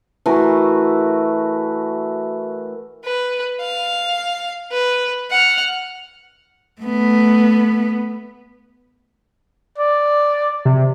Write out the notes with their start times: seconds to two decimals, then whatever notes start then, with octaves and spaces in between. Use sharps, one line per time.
0.26 E3 A3 F#4 A#4
3.05 B4
3.61 F5
4.72 B4
5.30 F#5 F6
6.82 A3 B3
9.78 D5
10.65 C3